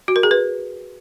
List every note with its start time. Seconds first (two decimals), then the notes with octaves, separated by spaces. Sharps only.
0.08 F#4
0.16 A#4
0.23 G#4
0.31 B4